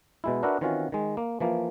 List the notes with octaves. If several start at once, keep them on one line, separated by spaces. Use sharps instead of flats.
B2 G#3 E4
D4 F#4 A#4 B4 E5 F#5
D#3 E3 C4 C#4 F4 F#4
D#3 G#3
A#3
E3 F3 A#3